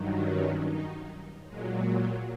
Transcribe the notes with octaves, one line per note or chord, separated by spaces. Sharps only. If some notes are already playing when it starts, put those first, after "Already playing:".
Already playing: G2 D#3 F#3
C#4
D#4
A#2 F#3 G#3